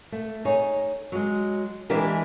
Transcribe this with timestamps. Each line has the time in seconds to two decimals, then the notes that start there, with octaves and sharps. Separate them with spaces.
0.12 A3
0.45 D#4 G#4 C#5
1.12 F#3 G#3
1.89 E3 G#3 D4 G4 A#4